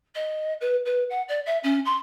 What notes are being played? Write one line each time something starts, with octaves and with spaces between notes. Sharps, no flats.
D#5
B4
B4
F#5
D5
E5
C#4
C6